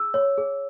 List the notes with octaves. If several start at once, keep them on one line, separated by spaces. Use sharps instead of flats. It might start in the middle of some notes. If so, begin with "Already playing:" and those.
Already playing: G#4 E6
C#5
G#4